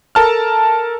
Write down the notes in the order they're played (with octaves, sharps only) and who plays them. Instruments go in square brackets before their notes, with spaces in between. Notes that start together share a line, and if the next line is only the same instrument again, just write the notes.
[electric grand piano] A4 A#4 A5 F6